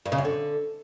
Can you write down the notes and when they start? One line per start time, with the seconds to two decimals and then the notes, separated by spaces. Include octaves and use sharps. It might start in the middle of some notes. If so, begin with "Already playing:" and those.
0.06 G2
0.12 C#3
0.18 F#2
0.25 D3